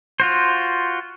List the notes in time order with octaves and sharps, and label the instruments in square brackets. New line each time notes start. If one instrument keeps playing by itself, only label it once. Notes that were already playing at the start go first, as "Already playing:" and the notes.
[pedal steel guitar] F4 F#4 C5